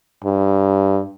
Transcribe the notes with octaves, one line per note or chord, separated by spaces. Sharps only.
G2